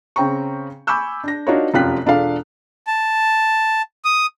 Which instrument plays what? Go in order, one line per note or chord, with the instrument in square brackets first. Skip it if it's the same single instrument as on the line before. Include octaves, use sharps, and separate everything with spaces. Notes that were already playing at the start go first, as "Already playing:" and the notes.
[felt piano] C#3 C4 G5 A#5 C#6
G#5 B5 C#6 D6 E6 G6
D4 A#6
D4 D#4 F4 F#4 A#4 C#5
F1 F#2 F4 G4 F#6 B6
E1 D4 F4 A4 F5
[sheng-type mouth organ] A5
D#6